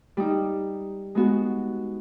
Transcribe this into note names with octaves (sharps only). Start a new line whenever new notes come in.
G3 D#4
G#3 B3 F#4